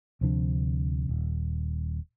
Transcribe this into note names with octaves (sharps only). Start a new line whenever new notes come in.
D2 C3 F3 D4
D#1